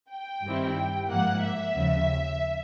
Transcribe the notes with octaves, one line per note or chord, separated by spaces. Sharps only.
G5
G2 D#3 G3 C4 E4
G#2 F3 A#3 F#5
E5
D#2 C#3 F3